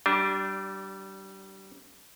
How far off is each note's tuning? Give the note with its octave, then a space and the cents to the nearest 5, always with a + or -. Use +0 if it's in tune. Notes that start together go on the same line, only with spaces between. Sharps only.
G3 -25 D4 +0